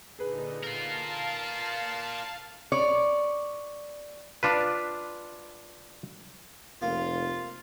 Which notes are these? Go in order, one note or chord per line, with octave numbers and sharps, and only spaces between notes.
A#2 D3 D#4 G#4 B4
F4 A#4 F5 A5
C#5 D5
D4 F4 B4
F1 A#3 F4